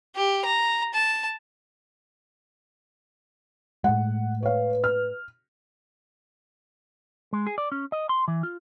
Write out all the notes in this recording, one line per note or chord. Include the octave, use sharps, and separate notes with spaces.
G4
A#5
A5
A2 G#3 F#5
B4 C#5 F5
F6
G#3
G#4
D5
C#4
D#5
C6
E3
F4